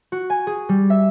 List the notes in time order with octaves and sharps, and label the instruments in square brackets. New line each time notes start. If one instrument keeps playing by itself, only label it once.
[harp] F#4
G#5
G#4
G3
E5